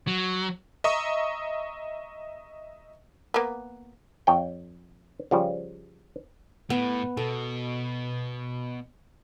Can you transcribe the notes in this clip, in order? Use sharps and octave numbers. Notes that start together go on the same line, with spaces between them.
F#3
D#5 E5 A#5 C#6 D#6
A#3 B3
F2 C#5 G5
C#3 F3 G3
A2 B3
B2 A4